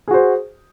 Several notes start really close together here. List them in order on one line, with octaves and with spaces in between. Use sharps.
G#4 F#4 C5